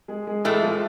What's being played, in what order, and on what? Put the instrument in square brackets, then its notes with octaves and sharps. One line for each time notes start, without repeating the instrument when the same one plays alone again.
[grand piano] G#3 G#4
G#3 G#4
[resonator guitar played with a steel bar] A2 E3 A3 [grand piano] G#3 G#4
[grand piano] F3 F4